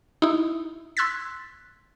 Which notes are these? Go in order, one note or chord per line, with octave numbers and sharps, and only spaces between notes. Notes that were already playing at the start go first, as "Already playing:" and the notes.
D#4 E4
C6 E6 F#6 G#6 A6 B6